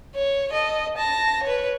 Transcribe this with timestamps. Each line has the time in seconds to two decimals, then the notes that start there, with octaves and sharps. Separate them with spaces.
0.15 C#5
0.52 A4 D#5
0.98 A5 A#6
1.44 B4 C#5